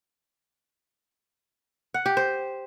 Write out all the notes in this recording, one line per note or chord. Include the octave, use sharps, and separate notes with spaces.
F#5
G4
C5